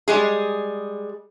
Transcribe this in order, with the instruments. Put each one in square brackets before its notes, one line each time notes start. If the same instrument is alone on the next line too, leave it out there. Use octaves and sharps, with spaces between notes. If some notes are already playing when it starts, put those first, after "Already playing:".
[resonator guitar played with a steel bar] G3 G#3 G#4